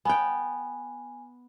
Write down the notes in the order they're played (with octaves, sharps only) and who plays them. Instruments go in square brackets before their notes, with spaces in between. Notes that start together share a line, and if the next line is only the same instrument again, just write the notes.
[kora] B3 G5 [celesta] G#5